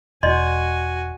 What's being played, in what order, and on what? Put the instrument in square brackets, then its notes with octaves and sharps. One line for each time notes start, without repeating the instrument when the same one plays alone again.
[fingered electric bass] E1 [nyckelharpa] F#4 G#5 [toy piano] D5 D#5 C6